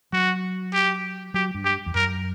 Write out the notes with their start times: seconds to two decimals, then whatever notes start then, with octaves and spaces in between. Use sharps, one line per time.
0.13 F#3 F#4
0.74 G4
1.34 F#3 G4
1.55 G2
1.65 G4
1.86 E2
1.95 F#2 A#4